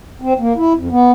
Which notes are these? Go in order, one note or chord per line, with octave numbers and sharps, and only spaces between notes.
C4
A#3
E4
F2
B3